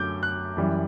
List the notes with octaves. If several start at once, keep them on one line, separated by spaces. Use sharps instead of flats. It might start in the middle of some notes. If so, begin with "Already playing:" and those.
Already playing: F#2 D3 F#3 A3 D6 G6
F#6
F#2 E3 G3